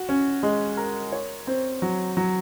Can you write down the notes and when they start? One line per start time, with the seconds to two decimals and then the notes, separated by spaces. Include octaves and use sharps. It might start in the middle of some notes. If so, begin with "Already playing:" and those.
Already playing: F#4
0.09 C#4
0.43 G#3
0.77 A#4
1.12 C#5
1.47 C4
1.82 F#3
2.17 F#3